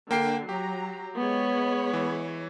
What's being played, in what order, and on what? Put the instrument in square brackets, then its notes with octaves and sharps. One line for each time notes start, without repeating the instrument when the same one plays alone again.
[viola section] D3 [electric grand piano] A#3 G5 C7
[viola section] F#3 A#5 [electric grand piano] G4
[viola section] G#3 C#5 B5 [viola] B3
[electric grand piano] E3